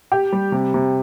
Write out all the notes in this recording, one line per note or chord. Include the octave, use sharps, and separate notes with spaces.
G4
G3
C3
C3